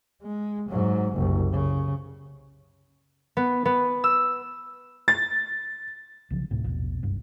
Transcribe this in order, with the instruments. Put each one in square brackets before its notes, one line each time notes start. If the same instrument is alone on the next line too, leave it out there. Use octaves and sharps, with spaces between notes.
[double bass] G#3
G#2 F#3
F#1 C2
C#3
[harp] B3
B3
E6
[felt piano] A6
[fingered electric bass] B1 C#3 F3
D2 A2 C3
A#1 E2 B2
F#1 C2 G2